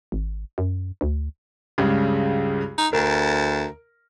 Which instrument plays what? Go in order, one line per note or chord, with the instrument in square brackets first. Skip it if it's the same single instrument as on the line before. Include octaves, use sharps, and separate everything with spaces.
[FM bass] G#1
F#2
D2
[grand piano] C#2 G2 C#3
[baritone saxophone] D#4
[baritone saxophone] D2 [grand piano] A#4